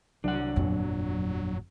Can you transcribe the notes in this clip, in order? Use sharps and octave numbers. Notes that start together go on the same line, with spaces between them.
C2 F#3 D4 F#5
G1 F2 A#2